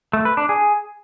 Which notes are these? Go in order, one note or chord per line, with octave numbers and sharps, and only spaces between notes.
A3
B4
D4
G#4